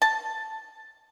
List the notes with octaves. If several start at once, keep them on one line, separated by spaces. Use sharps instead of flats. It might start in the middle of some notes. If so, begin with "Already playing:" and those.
A5